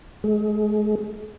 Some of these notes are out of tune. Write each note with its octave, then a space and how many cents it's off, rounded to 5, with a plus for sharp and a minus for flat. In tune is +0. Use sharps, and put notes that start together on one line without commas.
G#3 +35